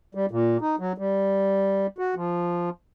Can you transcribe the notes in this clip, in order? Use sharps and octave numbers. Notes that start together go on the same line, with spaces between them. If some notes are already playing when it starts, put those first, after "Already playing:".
G3
A#2
D#4
F#3
G3
F#4
F3